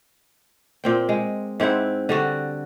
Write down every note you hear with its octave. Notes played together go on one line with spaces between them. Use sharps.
A#2 C4 G5
G#3
G#2 C4 E4 F#5
D3 G3 F#4